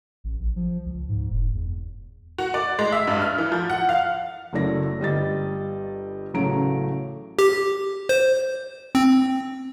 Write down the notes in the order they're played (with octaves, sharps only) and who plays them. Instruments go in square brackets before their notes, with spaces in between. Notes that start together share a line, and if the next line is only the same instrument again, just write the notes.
[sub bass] A1
A#1
F3
C#2
G#2
E1
E2
[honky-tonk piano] F#4
D5
G#3
E5
G2
F6
E3
F3
F#5
F5
[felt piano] F#1 F#3 A3 E4 D5 A#6
G1 G3 D#5 A6
A1 C#3 F#3 A3 A#5 D7
[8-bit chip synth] G4
C5
C4